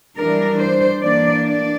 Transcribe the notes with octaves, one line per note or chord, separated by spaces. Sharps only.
E3 G3 D4 A#4
C5
E3 A#3 D4 D5
D5